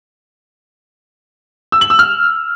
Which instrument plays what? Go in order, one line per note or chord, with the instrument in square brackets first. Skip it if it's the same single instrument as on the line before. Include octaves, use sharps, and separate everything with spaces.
[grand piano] E6
F#7
E6
F6